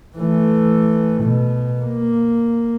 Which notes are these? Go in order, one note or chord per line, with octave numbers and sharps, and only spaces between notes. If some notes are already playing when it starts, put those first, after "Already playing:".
E3 A3
B2
A#3